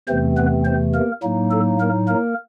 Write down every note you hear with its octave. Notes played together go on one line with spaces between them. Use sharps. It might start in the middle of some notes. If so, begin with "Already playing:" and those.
E2 C3 E3 A3 C4 C5
B3 B4
C4 C5
A#3 A#4
A2 F#3 A#3 D#4
A4
A#3 A#4
A#3 A#4